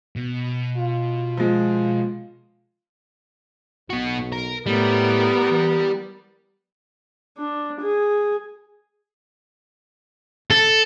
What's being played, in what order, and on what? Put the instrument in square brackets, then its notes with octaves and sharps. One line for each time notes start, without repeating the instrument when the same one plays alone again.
[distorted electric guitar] B2
[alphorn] F4
[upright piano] F3 G#3
[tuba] B1 [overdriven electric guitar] B3 F#4
[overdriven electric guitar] A#4
[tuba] A2 [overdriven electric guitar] G3 [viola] B3 A#4
[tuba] E3
[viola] D4
G#4
[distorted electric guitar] A4